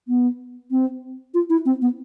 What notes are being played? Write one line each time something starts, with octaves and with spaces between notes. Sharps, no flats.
B3
C4
F4
E4
C4
B3